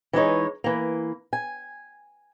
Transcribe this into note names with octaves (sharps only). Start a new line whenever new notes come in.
E3 G#3 D#4 C#5
E3 A#3
G#5